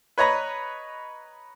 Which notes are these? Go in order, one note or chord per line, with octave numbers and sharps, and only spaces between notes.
B4 C#5 D#5 A#5 B5